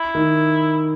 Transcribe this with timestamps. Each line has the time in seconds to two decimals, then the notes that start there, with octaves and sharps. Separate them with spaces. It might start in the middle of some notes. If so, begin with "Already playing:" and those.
Already playing: E4
0.15 D#3